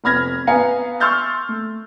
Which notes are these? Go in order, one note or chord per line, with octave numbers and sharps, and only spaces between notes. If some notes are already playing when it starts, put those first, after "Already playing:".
F1 B3 B5 F6 G#6 A#6
B3 B4 F5 G#5 A#5 C#7
C6 C#6 E6 F6 G6 A6
A3